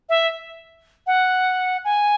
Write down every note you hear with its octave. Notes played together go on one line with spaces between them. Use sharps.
E5
F#5
G#5